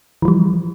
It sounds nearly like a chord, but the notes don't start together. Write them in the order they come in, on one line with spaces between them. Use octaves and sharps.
E3 F3 G3